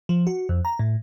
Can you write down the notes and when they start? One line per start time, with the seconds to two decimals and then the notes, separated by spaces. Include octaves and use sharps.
0.09 F3
0.27 F#4
0.49 F2
0.65 A#5
0.79 A2